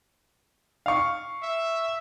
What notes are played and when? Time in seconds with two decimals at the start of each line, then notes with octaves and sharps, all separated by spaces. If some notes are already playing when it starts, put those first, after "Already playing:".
0.86 F5 C#6
1.43 E5